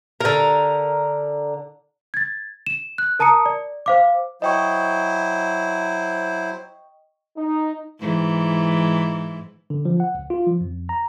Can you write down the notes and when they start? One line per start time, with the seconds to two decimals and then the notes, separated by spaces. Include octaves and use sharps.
0.20 D3 A#4
2.14 G#6 A6
2.67 E7
2.98 F#6
3.19 A#4 A5 A#5 D#6 C#7
3.46 D5
3.86 C5 F5 D6
4.42 F#3 E4 C5 D#5 G5 C#6
7.37 D#4
8.00 G#2 E3
9.70 D3
9.85 F3
10.00 F#5
10.14 C#2
10.30 F4
10.47 F3
10.61 F2
10.89 A#5